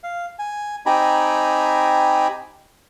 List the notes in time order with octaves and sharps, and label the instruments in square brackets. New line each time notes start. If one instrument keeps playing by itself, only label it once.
[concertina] F5
G#5
C4 D#4 G4 G#5 A#5 B5